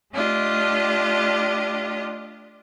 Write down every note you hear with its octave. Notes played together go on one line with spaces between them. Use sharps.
A3 D4 F4 G4 D#5